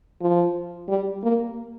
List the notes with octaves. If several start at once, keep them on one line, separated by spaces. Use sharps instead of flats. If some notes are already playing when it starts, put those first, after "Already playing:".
F3
G3
A#3